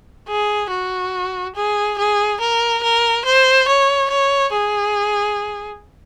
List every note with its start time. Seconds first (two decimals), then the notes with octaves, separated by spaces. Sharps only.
0.28 G#4
0.71 F#4
1.55 G#4
1.98 G#4
2.40 A#4
2.83 A#4
3.25 C5
3.68 C#5
4.10 C#5
4.53 G#4